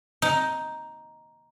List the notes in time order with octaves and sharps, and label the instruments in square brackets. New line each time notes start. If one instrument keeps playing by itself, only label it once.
[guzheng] D#4